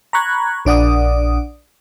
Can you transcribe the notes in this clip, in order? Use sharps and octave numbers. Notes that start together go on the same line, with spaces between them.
A#5 B5 C#6 F#6 G#6
A#1 D4 D5 F#5 D#6